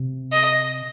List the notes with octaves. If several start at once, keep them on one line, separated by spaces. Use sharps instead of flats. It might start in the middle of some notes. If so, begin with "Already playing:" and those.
Already playing: C3
D#5